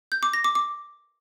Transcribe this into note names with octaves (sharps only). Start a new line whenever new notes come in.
G6
D6
A#6
D6
D6